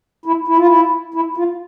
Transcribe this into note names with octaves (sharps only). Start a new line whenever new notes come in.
E4
E4
F4
E4
E4
F4